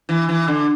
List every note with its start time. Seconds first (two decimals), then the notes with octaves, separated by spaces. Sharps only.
0.09 E3
0.29 E3
0.48 D3